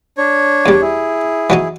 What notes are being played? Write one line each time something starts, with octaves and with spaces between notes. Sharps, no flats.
D4 C#5
E2 G3
E4 G#4
E3 F#3 D#4